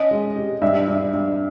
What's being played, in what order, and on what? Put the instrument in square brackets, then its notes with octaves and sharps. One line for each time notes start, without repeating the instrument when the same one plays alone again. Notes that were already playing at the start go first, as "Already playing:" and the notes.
Already playing: [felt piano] C#4 [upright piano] D#5
[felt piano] G#3
G4
[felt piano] G2 [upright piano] E5
[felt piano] G2
G2